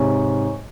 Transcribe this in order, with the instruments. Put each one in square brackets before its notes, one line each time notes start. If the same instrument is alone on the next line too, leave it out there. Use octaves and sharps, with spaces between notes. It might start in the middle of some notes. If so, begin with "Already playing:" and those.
Already playing: [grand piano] G#2 C3 [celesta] C#5 G#5 C#6